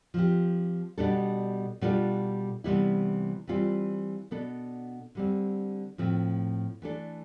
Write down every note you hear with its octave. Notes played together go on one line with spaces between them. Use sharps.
F3 C4 G4
B2 G3 B3 D4 A4
B2 G3 D4 F4 A4
C3 E3 G3 B3 E4
E3 G3 C4 F4
B2 B3 D4 A4
D3 G3 C4
A2 F3 A3 C4
E3 A3 D4 A4